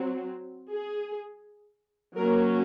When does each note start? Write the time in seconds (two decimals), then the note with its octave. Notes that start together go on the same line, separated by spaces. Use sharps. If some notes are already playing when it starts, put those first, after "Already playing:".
Already playing: F#3 C4
0.71 G#4
2.17 F#3 A#3 C#4 A#4